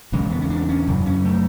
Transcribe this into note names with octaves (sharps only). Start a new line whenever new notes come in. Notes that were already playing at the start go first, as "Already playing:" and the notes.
E2 C#3 G#3
B3
C#4
D4
C#4
F#2 C#3
C#4
A3